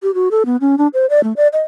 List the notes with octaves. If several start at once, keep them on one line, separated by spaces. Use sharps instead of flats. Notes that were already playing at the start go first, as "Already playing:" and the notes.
G4
F#4
A4
B3
C#4
D4
C5
D5
A3
D5
D#5